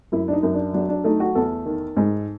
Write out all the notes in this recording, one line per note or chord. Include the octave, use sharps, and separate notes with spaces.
F#2 E4
D4
D#4
F#2
D4
F#3 D4
D4
A3 D#4
F#4
E2 A4
D#3
G#2